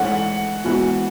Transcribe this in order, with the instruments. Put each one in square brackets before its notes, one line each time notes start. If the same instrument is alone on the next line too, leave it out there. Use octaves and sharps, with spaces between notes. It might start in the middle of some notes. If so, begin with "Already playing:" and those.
Already playing: [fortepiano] G#2 E3 A3 C#4 [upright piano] F#5
[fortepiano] G#2 E3 B3 F#4